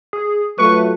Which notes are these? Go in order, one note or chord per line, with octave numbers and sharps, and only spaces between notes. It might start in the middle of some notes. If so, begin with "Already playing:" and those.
G#4
F#3 A3 F4 B4 C#6